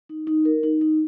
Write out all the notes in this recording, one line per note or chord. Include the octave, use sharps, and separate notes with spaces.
D#4
D#4
A#4
D#4
D#4